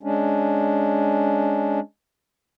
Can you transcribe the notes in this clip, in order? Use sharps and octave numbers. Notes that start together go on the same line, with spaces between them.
G#3 C#4 D4